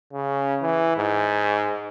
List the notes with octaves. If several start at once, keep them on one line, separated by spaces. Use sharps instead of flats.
C#3
E3
G#2